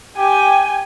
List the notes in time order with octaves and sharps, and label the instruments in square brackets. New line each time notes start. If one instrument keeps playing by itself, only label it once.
[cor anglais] G4 [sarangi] G5 [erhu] G#5